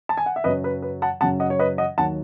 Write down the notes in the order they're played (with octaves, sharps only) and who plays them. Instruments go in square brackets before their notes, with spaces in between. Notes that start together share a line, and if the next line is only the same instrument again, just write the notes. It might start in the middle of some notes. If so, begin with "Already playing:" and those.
[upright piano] A5
G#5
F#5
E5
F#2 C#3 F#3 B4 D#5
B4
B4
F#5 A5
F#2 C#3 F#3 F#5 A5
D#5 F#5
C#5
B4 D#5
D#5 F#5
D#2 D#3 F#3 F#5 A5